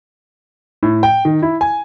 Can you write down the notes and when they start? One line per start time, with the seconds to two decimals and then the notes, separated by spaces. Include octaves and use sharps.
0.83 A2
1.03 G5
1.25 D#3
1.42 E4
1.61 G#5